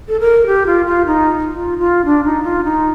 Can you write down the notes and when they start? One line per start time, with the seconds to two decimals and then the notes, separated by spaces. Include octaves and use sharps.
0.09 A4
0.20 A#4
0.46 G4
0.66 F4
0.86 F4
1.06 D#4
1.52 F4
1.78 F4
2.05 D4
2.25 D#4
2.44 F4
2.64 D#4